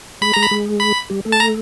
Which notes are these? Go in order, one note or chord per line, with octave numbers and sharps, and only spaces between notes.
G#3 G#4 B5
G#3 G#4 A#5
B5
G#3 G#4
B5
G3 G4
A3 A4
A5
A#5